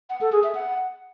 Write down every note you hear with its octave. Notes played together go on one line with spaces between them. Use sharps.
F#5
A4
G#4
E5
F#5